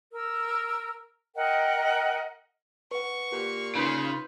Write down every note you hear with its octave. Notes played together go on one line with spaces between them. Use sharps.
A#4 E6
A#4 D#5 F#5 G5
B4 F#5 C#6
A#2 G4
C#3 D#4 F4 B4 G6 B6